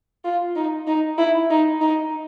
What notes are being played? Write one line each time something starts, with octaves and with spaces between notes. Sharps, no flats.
F4
D#4
D#4
E4
D#4
D#4